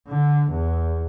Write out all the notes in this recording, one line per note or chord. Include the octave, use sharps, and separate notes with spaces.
D3
E2